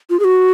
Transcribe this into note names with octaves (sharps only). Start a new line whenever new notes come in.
F4
G#4
F#4